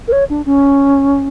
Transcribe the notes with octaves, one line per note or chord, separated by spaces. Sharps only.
A#4
C#5
D4
C#4